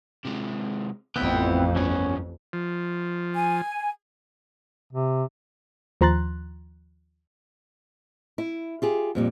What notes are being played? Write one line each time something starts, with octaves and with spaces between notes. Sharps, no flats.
C3 G#3
A1 F2 B3 C4 E4 F5 G5
G2 F3 B3 C#4
F3
G#5
C3
D#2 F3 A#5 C6 F#6 A6
E4
F4 G4 G#4
F2 A#2 G3